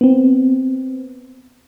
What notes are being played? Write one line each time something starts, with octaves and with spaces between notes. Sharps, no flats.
B3 C4